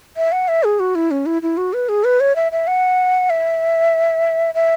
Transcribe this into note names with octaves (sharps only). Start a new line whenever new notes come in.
E5
F#5
E5
G#4
F#4
E4
C#4
E4
E4
F#4
B4
G#4
B4
C#5
E5
E5
F#5
E5
E5